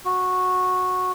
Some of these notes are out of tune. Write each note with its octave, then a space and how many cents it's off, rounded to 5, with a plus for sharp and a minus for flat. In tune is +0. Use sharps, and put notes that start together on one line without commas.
F#4 -10